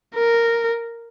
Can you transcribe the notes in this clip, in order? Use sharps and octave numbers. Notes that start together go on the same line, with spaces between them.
A#4